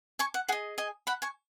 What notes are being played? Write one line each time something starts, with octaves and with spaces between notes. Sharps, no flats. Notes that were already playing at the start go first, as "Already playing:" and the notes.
G#5 C#6
F#5
G#4 D#5 F#5
D#5 G#5
F#5 B5
G#5 C#6